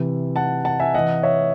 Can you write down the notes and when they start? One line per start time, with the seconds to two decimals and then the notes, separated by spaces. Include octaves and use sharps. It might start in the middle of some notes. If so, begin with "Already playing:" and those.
Already playing: C3 E3
0.36 F#5 A5
0.65 F#5 A5
0.79 E5 G#5
0.94 C3 E3 D#5 F#5
1.23 C#5 E5